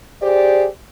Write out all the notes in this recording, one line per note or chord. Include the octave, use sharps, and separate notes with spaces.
G4 G#4 C5 D5